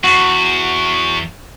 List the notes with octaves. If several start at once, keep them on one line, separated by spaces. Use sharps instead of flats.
E2 F#4